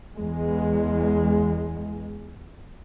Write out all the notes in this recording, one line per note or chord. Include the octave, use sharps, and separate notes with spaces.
E2 G#3